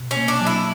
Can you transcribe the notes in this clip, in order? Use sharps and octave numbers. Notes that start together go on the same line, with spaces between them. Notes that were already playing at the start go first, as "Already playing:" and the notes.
Already playing: B2
C#4
A#3
D4
F#3
E4